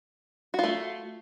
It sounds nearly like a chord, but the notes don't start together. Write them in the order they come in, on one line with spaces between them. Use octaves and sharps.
F#4 F4 A3